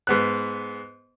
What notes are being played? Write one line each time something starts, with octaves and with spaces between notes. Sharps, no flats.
G#2 B3 F#6